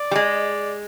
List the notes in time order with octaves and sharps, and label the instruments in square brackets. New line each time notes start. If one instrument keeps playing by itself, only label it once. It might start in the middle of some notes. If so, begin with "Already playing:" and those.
Already playing: [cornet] D5
[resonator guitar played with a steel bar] G3
G#3